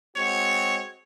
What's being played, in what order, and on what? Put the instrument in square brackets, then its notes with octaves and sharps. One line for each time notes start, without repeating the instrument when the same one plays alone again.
[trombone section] G#3 C4 F#4 [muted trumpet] C#5